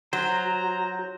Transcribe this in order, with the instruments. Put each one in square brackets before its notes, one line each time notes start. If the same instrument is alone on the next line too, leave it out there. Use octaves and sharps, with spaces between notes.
[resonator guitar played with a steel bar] F#3 [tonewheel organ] F#4 [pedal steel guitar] C5 [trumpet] A#5